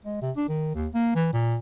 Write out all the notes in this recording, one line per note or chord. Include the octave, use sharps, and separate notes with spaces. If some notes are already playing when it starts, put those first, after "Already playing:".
G#3
C3
D4
D#3
D#2
A#3
E3
A#2